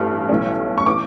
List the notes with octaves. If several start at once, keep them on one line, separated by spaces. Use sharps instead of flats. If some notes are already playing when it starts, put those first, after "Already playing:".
Already playing: A1 G2 E3 A3
B1 A2 E3 A3 C#4
C#6
E3 B3 D6